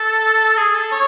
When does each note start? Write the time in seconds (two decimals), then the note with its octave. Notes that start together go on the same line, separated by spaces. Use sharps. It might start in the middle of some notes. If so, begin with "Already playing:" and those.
Already playing: A4
0.57 G#4
0.74 A4
0.92 C#5